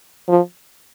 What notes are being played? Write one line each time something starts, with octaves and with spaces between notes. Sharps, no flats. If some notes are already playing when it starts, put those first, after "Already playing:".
F3